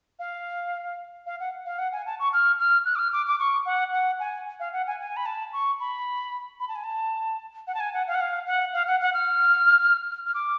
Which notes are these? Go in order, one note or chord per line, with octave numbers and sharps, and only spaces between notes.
F5
F5
F#5
F5
F#5
G#5
A5
C#6
F6
F6
F#6
D6
F6
D6
D6
C#6
F#5
F#5
G#5
F5
F#5
G#5
G#5
B5
A5
C#6
B5
B5
A5
G#5
A5
F#5
A5
G#5
F#5
F5
F#5
F5
F#5
F5
F#5
F#5
F6
F6
D6